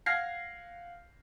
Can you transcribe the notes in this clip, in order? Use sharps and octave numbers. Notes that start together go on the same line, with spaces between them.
F5 F#5 F6 G#6 A#6 C7